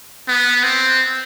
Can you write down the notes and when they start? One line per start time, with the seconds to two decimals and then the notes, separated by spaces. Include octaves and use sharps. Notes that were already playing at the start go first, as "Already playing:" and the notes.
0.28 B3
0.63 C4